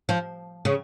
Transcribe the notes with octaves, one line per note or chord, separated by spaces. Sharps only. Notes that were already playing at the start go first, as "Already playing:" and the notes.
F3
C#3